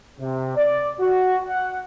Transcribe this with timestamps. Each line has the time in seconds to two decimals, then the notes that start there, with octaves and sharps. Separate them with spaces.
0.19 C3
0.56 D5
1.00 F#4
1.45 F#5